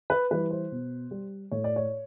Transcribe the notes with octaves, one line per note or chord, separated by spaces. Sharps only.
B4
E3 G3 B4
C5
B2
G3
A2 C#5
D5
C#5